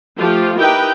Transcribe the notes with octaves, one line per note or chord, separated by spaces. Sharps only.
F3 A3 F4 G4
D#4 E4 G4 A#4 B4 G5